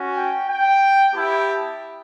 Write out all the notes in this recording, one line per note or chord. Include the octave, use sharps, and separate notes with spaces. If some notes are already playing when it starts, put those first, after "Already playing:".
Already playing: C#4 F#4
G5
G5
B3 E4 G4 A5